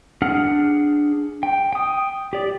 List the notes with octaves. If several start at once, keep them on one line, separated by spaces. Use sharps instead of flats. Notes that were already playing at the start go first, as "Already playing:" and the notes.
D4 G#4 F#5 F6
G5
G5 D#6
G4 D5